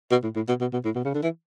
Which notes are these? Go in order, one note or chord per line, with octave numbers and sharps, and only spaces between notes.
B2
A2
A2
B2
B2
B2
A2
B2
C#3
D3
E3